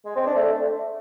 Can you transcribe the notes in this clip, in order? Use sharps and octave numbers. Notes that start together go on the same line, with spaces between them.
G#3
C4
D4
A3